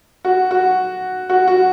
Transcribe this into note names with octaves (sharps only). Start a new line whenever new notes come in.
F#4
F#4
F#4
F#4